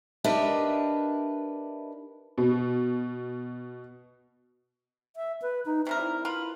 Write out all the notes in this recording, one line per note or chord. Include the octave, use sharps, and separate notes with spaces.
D4 G4 A#4 B4 D#5 E5
B2
E5
B4
D#4
C3 G3 A#4 E5
E4
F4 A#4 B4